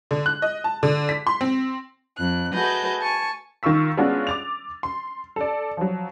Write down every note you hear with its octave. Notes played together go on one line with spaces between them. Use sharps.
D3
F#6
D#5
A5
D3
B6
C6
C4
F2 F#6
A3 F#4 G#4 B4 D#5 G6
G#5 A5 C#6
D#3 F4 C#6 E6 B6
G#3 B3 C#4 D4 F4 F#4
D6 A6 F7
C6
A4 D5
F3 F#3